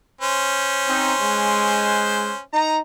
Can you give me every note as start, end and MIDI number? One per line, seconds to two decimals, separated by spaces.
0.21 2.40 61
0.21 2.40 72
0.87 1.12 60
0.87 1.12 63
1.20 2.32 56
2.53 2.78 63
2.53 2.78 82